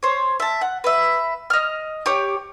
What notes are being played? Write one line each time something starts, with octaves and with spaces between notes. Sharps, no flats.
C5 C#5
E5 A5
F#5
B4 E5
D#5 F6
G4 C#5 D6